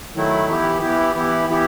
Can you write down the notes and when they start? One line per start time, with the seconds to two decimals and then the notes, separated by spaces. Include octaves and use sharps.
0.15 D#3 F#3 A3 E4
0.48 E3 B3 E4 G4
0.82 E3 B3 E4 G4
1.15 E3 B3 E4 G4
1.48 E3 B3 E4 G4